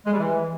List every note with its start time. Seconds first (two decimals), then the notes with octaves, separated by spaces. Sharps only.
0.06 G#3
0.12 G3
0.19 E3